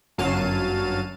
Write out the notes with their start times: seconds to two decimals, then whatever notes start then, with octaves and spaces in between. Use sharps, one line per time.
0.18 G1 F#2 F#3 F5 A5 D#7